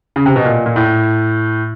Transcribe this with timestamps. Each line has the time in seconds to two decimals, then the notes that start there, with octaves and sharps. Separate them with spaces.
0.16 C#3
0.26 C3
0.36 B2
0.45 A#2
0.66 A#2
0.76 A2